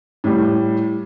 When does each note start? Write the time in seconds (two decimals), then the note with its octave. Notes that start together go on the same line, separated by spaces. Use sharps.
0.24 A2 G3